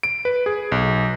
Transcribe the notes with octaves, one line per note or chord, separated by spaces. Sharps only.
D7
B4
G#4
B1